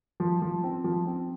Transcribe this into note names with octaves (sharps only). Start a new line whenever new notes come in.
F3
F3
C4
F3
C4